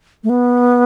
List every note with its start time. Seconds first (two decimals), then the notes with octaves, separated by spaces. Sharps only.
0.24 A3
0.29 B3